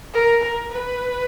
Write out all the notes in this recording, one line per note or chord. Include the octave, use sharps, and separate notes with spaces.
A#4
A#4
B4